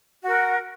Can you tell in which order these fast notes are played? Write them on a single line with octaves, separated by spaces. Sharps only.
F#4 A#4 F#5